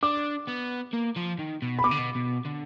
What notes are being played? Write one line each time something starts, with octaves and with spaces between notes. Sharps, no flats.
D4 D6
B3
A#3
F3
D#3
B2
B5
B2 D6
D3
B2
B2
D3